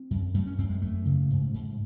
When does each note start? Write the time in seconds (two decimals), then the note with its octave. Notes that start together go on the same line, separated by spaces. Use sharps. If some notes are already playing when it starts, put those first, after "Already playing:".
Already playing: C4
0.11 F#2
0.34 F#2 A3
0.47 C#4
0.58 F#2 C4
0.69 G#3
0.82 F#2 A3
1.05 C#3
1.30 G#2
1.54 G#2